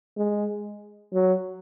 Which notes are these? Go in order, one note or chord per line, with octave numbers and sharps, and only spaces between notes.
G#3
F#3